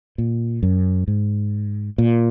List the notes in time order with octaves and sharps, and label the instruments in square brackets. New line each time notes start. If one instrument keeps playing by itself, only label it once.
[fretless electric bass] A#2
F#2
G#2
A#2